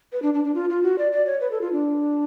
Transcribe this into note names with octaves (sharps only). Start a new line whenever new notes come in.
B4
D4
D4
D4
F4
F4
F#4
D5
D5
C#5
B4
A4
F4
D4